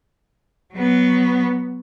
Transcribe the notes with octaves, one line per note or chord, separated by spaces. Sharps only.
F#3 B3